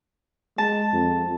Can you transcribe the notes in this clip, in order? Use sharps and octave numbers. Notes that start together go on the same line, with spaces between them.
G#3 A5
F2